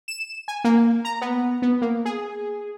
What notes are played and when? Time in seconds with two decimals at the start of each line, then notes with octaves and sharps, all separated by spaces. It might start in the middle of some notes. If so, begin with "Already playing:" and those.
0.08 E7
0.48 G#5
0.64 A#3
1.05 A#5
1.21 B3
1.62 B3
1.82 A#3
2.05 G#4